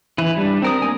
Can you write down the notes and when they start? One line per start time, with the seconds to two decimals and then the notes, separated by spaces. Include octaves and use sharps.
0.18 E3 B4
0.37 G3 D4
0.62 C4 A#4 D#6
0.82 A#3 C4 G#5